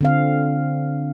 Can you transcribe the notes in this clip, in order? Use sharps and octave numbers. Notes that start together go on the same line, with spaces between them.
D3 C4 F5